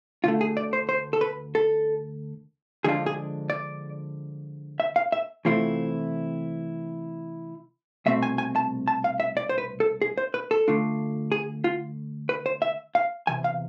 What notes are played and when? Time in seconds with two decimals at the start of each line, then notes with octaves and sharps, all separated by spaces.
0.24 D2 D3 A3 F4
0.41 G#4
0.57 D5
0.73 C5
0.89 C5
1.13 A4
1.21 B4
1.55 A4
2.84 D3 F3 G#3 D4 F4 G#4
3.06 G#4
3.50 D5
4.80 E5
4.96 F5
5.12 E5
5.45 C3 E3 A3 C4 E4 F4
8.06 C2 B2 A3 C4 E5
8.23 G#5
8.38 G#5
8.56 A5
8.88 A5
9.04 F5
9.20 E5
9.37 D5
9.49 C5
9.58 B4
9.80 A4
10.02 G#4
10.18 C5
10.34 B4
10.51 A4
10.68 D3 A3 D4 F4
11.32 G#4
11.64 F4
12.29 B4
12.46 C5
12.62 E5
12.95 F5
13.27 E2 C3 G#5
13.44 F5